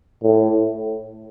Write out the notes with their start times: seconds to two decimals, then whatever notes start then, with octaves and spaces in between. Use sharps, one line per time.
0.23 A2